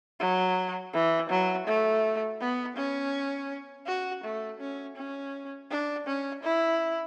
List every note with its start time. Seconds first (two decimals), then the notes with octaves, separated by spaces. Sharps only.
0.20 F#3
0.93 E3
1.30 F#3
1.67 A3
2.40 B3
2.76 C#4
3.86 F#4
4.24 A3
4.60 C#4
4.96 C#4
5.70 D4
6.06 C#4
6.43 E4